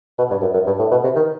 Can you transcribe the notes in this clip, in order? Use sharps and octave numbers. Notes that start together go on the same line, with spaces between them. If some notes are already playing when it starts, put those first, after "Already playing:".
B2
G2
F#2
F#2
G2
A2
B2
C3
D#3